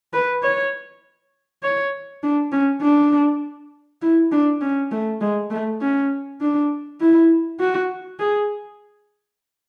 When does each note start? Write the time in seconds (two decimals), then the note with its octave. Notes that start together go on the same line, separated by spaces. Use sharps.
0.13 B4
0.43 C#5
1.63 C#5
2.23 D4
2.52 C#4
2.82 D4
4.02 E4
4.32 D4
4.61 C#4
4.92 A3
5.21 G#3
5.51 A3
5.81 C#4
6.41 D4
7.00 E4
7.60 F#4
8.19 G#4